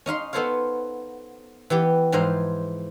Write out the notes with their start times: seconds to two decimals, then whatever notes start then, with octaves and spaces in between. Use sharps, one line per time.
0.06 C#4 D#4 F5 C6
0.33 B3 F4 A4 C5 C#5 F5
1.70 E3 B3 G4
2.12 G#2 E3 F3 G#3 C5 A#5